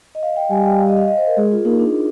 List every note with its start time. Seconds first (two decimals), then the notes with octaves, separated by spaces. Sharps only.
0.15 D#5
0.23 F5
0.36 G5
0.50 G3 G#5
0.66 G5
0.80 F5
0.89 D#5
0.97 F5
1.08 D#5
1.18 C5
1.27 A#4
1.37 G#3 G#4
1.51 F4
1.65 A#3 D#4
1.79 D4